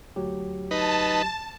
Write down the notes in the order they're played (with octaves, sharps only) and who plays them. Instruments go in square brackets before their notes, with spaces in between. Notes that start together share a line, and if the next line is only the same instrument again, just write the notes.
[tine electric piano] D2 F#3 G4
[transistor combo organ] D#4 B4 [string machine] A5